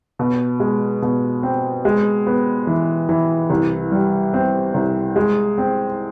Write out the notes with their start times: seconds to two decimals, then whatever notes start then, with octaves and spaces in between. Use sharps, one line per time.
0.19 B2
0.60 G#3
1.02 B2
1.43 C4
1.85 G#3
2.27 B3
2.67 E3
3.09 E3
3.50 C2
3.92 G3
4.34 C4
4.74 C2
5.16 G#3
5.58 C4